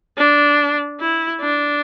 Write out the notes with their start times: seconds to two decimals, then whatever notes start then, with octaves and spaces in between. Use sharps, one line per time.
0.18 D4
1.00 E4
1.41 D4